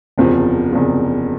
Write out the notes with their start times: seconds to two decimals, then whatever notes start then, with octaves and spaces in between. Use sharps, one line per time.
0.18 F#1 E2 C3 F3
0.73 F#1 E2 C3 F3